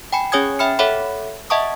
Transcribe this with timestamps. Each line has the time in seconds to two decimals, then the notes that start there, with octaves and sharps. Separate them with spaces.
0.13 G5 G#5 B5 C#7
0.32 C#4 G#4 C#5 G#5 D#6 G#6
0.59 E5 G5 B5 F6 C#7
0.79 A4 C#5 E5 F#5 B5
1.50 D#5 E5 F#5 A5 C#6 D#6